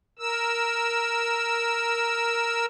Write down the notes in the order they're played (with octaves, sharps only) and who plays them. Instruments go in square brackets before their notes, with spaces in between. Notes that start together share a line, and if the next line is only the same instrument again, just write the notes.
[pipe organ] A#4 E6